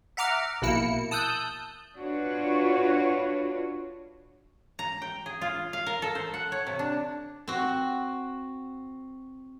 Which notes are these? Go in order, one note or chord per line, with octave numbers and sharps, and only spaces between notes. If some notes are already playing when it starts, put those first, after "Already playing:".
E5 F#5 A#5 D6 F6
A#1 B2 A#3 E4 C#7
A5 D#6 E6 F#6 G6
D4 F4 F#4 B4 C#5
A#5
G5
G#4
F4
F5
A#4
A4
C5
F#5
C#5
C3
D4
C4 F#4